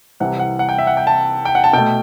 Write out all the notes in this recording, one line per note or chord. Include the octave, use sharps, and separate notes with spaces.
C2 C3 E3 F#5
F#5
F#5
G5
E5
F#5
G5
A5
G5
F#5
A5
B2 A3 G5